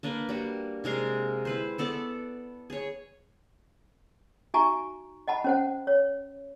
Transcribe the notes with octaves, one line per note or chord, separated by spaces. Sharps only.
A#3 D4 A#4 B4
G3 A#3 F#4
C3 G#3 A#4 F5
E4 B4 C5
B3 A4 D5 D6
G#4 C#5
D#4 F#4 E5 G#5 A#5 C#6
D#5 F#5 A5 B5
C#4 C5 F#5
C#5